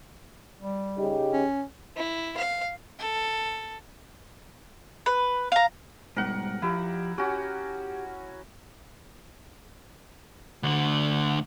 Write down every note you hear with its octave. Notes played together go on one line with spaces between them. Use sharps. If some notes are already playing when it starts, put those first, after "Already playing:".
G3
C#3 D#4 G4
C#4
E4
F5
A4
B4
F5 A#5
G#2 B2 G3 A#4 F#5
F3 E4 G4
C#4 F#4 G4
D2 D3